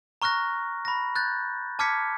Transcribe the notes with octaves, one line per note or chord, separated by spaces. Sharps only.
A#5 C#6 F6 F#6 A#6
B5 A#6
F#6 G6 A6
A5 D6 F6 G#6 B6 C#7